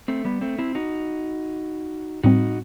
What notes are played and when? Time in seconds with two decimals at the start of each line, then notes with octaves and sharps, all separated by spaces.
0.08 A3 C4
0.25 G3 B3
0.41 A3 C4
0.59 C4 E4
0.75 D#4 F#4
2.24 A2 G3 C4 D#4 F#4